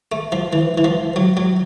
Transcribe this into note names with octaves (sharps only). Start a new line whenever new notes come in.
A3
F3
E3
E3
F3
F#3
F#3